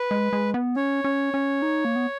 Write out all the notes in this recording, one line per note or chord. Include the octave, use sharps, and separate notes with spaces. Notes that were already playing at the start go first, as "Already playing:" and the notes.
Already playing: B4
G#3
G#3
B3
C#4 C#5
C#4
C#4
D#4
A#3
B3